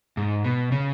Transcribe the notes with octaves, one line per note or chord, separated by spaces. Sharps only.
G#2
B2
C#3